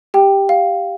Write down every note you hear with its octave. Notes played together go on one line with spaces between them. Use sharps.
G4 G5
F5